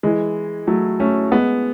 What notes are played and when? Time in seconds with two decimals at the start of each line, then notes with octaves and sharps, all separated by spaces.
0.03 E3 G#3
0.67 F#3 A3
1.00 A3 C#4
1.31 G#3 B3